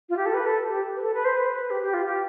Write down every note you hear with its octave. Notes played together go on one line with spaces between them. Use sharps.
F4
G4
A4
B4
A4
G4
B4
A4
B4
C5
B4
G4
G4
F4
G4